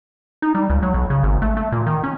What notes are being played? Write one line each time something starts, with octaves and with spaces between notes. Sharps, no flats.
D#4
G3
C#2
F#3
B1
C#3
G#1
A3
A3
A#2
D#3
C#4